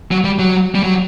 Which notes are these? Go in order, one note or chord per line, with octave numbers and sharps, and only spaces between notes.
F#3
G3
F#3
G3
F#3